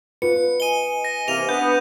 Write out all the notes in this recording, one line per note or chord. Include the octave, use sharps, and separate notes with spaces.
F4 B4 C#7
D#5 G#5 D#6 D#7 G7
A#6
C3 E3 A#3 D#7 F7
B3 D4 G6